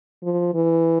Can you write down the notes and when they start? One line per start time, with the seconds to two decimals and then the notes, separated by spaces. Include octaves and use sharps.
0.23 F3
0.54 E3